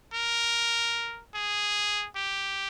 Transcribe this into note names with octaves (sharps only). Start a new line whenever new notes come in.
A#4
G#4
G4